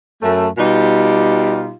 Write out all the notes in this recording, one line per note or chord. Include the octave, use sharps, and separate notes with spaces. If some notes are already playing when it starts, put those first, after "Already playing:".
F#2 A3
B2 G3 D#4 F4 G4